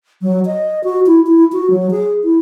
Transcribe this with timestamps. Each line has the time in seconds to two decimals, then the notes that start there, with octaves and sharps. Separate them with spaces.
0.22 F#3
0.46 D#5
0.84 F#4
1.07 E4
1.27 E4
1.53 F#4
1.70 F#3
1.91 G#4
2.24 E4